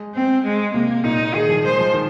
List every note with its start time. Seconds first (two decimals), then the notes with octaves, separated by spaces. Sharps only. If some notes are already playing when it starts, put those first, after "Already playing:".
Already playing: G#3
0.14 C4
0.44 G#3
0.74 C3 A#3
1.04 A#2 D#4
1.34 D#3 G#4
1.49 F3
1.64 G#3 C5
1.79 F3
1.94 D#3